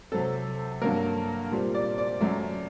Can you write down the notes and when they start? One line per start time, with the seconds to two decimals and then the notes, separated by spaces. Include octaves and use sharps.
0.12 C3 F#3 C4 A4
0.81 G2 F#3 A#3 A#4
1.51 A#2 G3 C4
1.74 D5
1.98 D5
2.21 F#2 F#3 A3